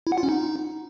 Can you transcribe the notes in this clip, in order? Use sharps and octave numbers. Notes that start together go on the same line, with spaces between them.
E4
F#5
F4
C#4
D#4